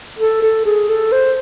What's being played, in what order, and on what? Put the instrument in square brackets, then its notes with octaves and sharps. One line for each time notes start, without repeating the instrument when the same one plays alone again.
[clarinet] A4
A4
G#4
A4
C5